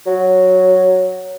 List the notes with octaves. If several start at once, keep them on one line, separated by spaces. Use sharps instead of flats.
F#3